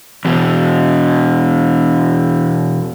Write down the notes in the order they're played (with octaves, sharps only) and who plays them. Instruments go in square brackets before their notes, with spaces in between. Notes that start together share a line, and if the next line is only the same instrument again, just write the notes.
[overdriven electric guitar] E2 B2